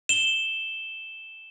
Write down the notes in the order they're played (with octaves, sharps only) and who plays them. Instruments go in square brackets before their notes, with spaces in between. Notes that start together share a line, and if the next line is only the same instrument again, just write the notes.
[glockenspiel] E7 G7